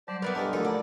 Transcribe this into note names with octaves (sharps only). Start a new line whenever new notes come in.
F#3 G3 C5 D5 A5
B3 E4 A#4 B4 D5
G2 D4 G4 A4 B4 C5 D#5 G#5
D3 F3 F#3 A3 A#3 D#4
D5 A5 B5